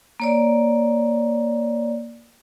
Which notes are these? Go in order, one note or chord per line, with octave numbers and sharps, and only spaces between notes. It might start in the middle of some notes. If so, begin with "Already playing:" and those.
A#3 C#5 D5